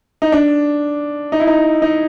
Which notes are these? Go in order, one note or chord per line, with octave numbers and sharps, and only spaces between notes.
D#4
D4
D#4
E4
D#4
D#4